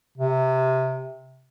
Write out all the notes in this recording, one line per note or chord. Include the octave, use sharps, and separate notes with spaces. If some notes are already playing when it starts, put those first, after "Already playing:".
C3